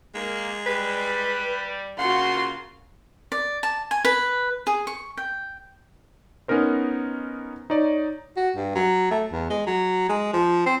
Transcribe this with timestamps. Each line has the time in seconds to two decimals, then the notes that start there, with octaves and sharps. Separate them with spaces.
0.15 G#3 A#3
0.66 G3 B4
1.98 C#3 A#3 F4 F#4 F#5 C6
3.32 D5
3.63 A5
3.91 G#5
4.05 B4
4.67 G#4
4.87 C#6
5.17 G5
6.48 B3 C#4 D#4 A#4 C5
7.70 D#4 C#5 D5
8.36 F#4
8.56 G2
8.75 F#3
9.11 A3
9.31 E2
9.50 G#3
9.66 F#3
10.09 G#3
10.33 F3
10.66 C4